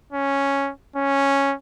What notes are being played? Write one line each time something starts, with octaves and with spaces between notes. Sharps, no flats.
C#4
C#4